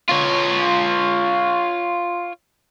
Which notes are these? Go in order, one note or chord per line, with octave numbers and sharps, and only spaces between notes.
F4 C#5